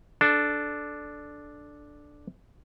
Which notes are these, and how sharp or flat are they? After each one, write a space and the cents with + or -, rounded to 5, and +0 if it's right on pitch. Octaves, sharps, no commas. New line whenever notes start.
D4 +0 A4 -15